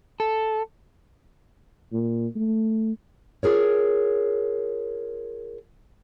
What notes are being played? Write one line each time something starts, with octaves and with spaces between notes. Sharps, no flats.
A4
A#2
A3
F4 G#4 A#4 C#5